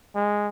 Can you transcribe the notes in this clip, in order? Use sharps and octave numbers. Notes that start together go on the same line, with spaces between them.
G#3